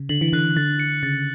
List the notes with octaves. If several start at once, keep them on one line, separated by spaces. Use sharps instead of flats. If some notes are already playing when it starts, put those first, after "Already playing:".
Already playing: C#3
D3 F#7
E3
D3 F#6
D3 A6
C#7
C#3 A6